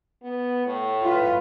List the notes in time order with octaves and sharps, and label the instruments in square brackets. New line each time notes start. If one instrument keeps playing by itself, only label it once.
[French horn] B3
A2
[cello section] F4 B4